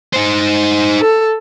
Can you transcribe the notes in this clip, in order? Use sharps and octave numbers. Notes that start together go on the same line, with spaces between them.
D#4 C5
A4